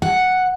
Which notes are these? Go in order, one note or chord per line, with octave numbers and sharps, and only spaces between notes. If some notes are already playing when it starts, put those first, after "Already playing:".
F#5